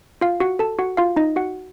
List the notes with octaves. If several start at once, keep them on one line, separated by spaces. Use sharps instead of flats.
F4 F5
F#4 F#5
A4 A5
F#4 F#5
F4 F5
D#4 D#5
F#4 F#5